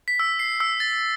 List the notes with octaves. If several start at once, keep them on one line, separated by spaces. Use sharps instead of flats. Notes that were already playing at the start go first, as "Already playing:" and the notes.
B6
E6
C7
E6
A6